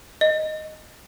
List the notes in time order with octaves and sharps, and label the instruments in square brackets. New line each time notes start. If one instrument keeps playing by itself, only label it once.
[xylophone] D#5